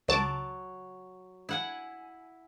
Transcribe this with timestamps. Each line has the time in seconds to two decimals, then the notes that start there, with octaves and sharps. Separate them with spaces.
0.08 C#2 F#3 A5 D6
1.49 E4 F#5 G#5